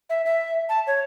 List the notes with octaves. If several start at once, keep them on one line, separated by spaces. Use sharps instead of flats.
E5
E5
A5
C#5